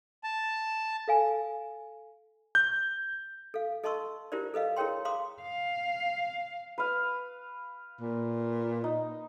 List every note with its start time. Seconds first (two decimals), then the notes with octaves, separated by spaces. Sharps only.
0.24 A5
1.08 A4 F5 G#5
2.55 G6
3.54 A4 F5
3.83 A4 D#5 A5 C6 C#6 E6
4.32 E4 F4 G4 A#4 C5 D5
4.54 A4 B4 D#5 F5
4.77 E4 G#4 A#4 C#5 G5 C6
5.05 F5 A#5 C6 D6 D#6
5.41 F5
6.78 B4 F5
8.01 A#2
8.84 D#4